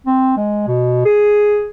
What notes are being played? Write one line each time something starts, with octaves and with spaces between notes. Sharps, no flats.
C4
G#3
B2
G#4